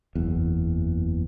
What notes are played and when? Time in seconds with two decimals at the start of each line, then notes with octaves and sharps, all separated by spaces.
0.15 F#1 E2